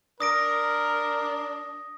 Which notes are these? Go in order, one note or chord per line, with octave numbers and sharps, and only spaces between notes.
D4 A#4 D#6 A#6 D7